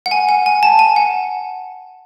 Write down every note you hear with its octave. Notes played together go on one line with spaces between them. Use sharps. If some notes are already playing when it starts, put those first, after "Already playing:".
F#5
G#5
F#5
G#5
A5
G#5
F#5